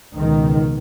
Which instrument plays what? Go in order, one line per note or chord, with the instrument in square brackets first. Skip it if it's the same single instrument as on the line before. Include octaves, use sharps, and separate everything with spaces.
[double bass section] C#2 B2 D#3